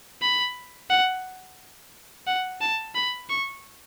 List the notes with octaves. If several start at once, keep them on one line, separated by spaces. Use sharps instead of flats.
B5
F#5
F#5
A5
B5
C#6